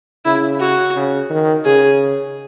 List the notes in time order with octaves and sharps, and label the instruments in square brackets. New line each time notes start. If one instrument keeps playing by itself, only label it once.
[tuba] C#3 [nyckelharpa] E4
[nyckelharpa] F#4
[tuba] C#3
D#3
[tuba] C#3 [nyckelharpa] G#4